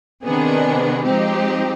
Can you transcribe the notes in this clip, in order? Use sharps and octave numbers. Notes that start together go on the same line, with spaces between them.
C3 D#3 B3 D4 G#4
F3 G#3 C4 D#4 G4